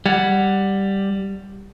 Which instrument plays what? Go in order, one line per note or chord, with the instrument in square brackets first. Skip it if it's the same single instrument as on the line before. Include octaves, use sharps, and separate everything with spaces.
[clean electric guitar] G3 [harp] F#5 G#6